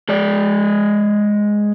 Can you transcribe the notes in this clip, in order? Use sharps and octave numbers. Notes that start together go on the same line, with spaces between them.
G#3 D5